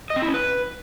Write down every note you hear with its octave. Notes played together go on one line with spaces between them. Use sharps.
D#5
C4
E4
C#4
B4